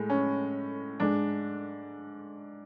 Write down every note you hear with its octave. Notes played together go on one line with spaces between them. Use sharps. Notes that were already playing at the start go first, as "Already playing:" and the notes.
Already playing: A2 G#3
C#4
G#2 G#3 D4